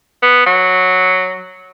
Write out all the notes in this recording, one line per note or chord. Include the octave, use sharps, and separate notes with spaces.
B3
F#3